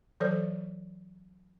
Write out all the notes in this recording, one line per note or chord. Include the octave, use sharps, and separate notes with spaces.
E3 F#3 A4 C5 D5